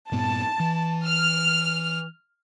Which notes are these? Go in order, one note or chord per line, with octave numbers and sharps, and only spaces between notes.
G2 A#2 B3 A5
E3
F6